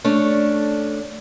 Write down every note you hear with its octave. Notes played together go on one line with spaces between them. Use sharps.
A3 C#4 D4